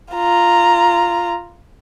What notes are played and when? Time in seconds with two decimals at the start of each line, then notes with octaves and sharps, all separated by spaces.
0.13 F4 A#5